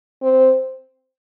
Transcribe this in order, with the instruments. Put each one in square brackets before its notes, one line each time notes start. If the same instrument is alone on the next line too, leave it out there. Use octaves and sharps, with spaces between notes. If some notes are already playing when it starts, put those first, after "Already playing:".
[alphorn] C4